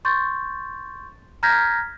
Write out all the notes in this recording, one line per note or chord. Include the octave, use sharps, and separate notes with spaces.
C6 C#6 G6 A6
A#5 F6 G6 G#6 A#6 B6